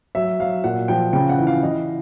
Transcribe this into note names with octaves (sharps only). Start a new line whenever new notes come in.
F#3 E5
F#3 F5
A#2 F#5
F3 G5
C#3 G5
F#5
E3
F5
E3 D#5